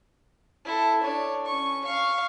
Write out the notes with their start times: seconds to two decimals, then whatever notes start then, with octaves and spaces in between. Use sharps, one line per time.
0.65 E4 A4
1.03 D4 C#5
1.46 C#4 C#6
1.84 F5 C#6